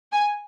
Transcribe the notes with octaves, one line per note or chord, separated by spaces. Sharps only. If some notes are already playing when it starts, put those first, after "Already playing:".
G#5